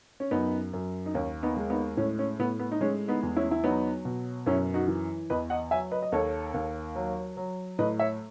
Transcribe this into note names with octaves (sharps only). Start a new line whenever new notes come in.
C#4
F#2 B3 D#4
F#2
D#4
D#2 C#4
B3 D#4
G#3
B3 D#4
A2 C#4
C#4
A2 B3
B3
D#4
G#3 C#4
B3 D#4
E2
C#4 E4
E4
F#3 B3 D#4
B2
F#2 C#4 E4
D#4 F#4
E3
E2 B4 D#5
D#5 F#5
F#3 E5 G#5
B4 D#5
D#5
D#2 A4 C#5
D#2
F#3
F#3
A2 B4 D#5
C#5 E5